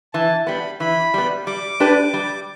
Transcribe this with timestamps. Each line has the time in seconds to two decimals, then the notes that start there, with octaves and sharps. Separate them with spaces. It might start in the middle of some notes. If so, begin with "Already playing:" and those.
0.13 E3 A5
0.47 G3 B3 B5
0.80 E3 B5
1.14 G3 B3
1.47 G3 D6
1.80 D4 G4 B4
2.14 G3